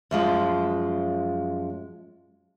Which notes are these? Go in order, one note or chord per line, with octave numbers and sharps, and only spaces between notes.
F#2 F3 G#3